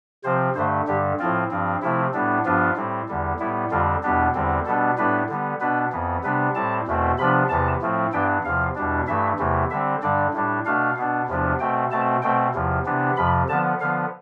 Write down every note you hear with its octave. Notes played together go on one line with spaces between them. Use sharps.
C3 F3 C4 C5
G2 D3 A3 C5
G2 D3 G3 G4
A2 F3 C4 F4
G2 F3 C4
C3 F3 A3 C4 E4
A2 G3 B3 D4
G2 F3 B3 D4 F4
A2 G3 C4
E2 D3 G3
A2 G3 B3 E4
F2 D3 G3 C4 F4
E2 B2 G3 B3 D4 G4
E2 D3 G3 C4
B2 G3 B3 D4 A4
A2 G3 B3 D4 B4
D3 G3 B3
B2 B3 D4 B4
F2 E3 B3
C3 G3 B3 D4 B4
A2 G3 C4 A5
E2 B2 A3 C4
C3 F3 B3 D4 B5
E2 C3 E3 B3 A5
A2 F3 A3 C4
G2 E3 B3 D4 G5
E2 C3 F3 F5
E2 B2 G3 D4
G2 E3 A3 E5
E2 C3 E3 A3
D3 G3 C4 E5
G2 D3 G3 D4 D5
A2 G3 D4
B2 A3 D4 F5
B2 B3 D4
E2 C3 F3 B3 D4
B2 A3 C4 G5
B2 A3 C4 A5
B2 A3 C4 G5
E2 C3 F3
C3 E3 B3 D4
F2 C3 F3 B5
D3 F3 B3 A5
D3 F3 B3 F5